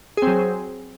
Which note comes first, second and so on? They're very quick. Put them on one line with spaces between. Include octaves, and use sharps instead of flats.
G#4 C4 F#3